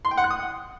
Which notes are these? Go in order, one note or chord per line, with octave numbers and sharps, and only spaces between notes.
C6
G5
F#5
F#6
D#6